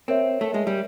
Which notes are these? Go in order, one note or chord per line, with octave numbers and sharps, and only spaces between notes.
C4 A#4 C#5 E5
A3
G#3
G3